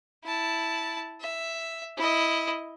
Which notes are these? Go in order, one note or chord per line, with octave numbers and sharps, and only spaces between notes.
E4 A5
E5
E4 D#5